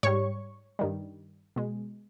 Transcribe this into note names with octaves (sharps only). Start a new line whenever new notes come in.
G#2 G3 C#5 C#6
G2 D#3 G3
B2 G#3